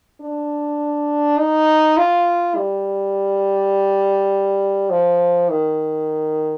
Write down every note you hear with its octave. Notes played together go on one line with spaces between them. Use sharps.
D4
D#4
F4
G3
F3
D#3